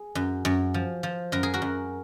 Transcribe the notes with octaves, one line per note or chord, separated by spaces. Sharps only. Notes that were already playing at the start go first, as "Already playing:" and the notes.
Already playing: G#4
F#2
F#2
F3
F3
F#2 A#4
G#4
F#4 A#4
F#2